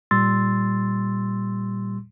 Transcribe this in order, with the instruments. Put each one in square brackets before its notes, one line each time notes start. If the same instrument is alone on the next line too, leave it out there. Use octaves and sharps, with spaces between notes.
[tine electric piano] A#2 G3 C6 E6 A6